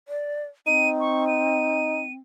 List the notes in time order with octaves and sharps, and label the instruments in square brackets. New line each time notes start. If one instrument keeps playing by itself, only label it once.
[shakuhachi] D5
[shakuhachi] C4 [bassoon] D#4 [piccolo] D#7
[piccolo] C#6
D#7